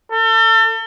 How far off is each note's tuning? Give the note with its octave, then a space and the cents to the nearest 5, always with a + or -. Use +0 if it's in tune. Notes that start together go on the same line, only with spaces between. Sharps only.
A4 +35